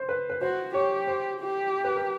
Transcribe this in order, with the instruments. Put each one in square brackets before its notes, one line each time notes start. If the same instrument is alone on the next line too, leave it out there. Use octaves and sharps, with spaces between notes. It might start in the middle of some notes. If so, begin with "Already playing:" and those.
Already playing: [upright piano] C5
B4
B4
[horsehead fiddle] F#4 [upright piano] C5
[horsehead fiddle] G4 [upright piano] C#5
[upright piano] C5
[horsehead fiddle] G4
[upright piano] B4
A#4